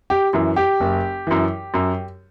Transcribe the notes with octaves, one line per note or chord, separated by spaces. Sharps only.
G4
F#2 E3
G4
F#1
F#2 E3
F#2